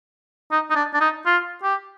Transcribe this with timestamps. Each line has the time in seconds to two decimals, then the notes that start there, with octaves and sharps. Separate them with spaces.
0.51 D#4
0.70 D#4
0.75 D4
0.94 D4
1.01 D#4
1.26 F4
1.63 G4